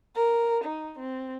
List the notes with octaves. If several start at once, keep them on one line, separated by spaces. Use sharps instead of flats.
A#4
D#4
C4